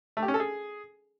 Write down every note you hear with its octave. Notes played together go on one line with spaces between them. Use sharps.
A3
G4
C#4
A4
G#4